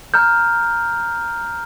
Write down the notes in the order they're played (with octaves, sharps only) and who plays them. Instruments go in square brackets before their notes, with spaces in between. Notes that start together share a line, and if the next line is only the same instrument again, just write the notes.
[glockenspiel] A#5 F6 G6